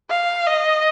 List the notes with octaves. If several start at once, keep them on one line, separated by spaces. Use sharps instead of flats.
F5
D#5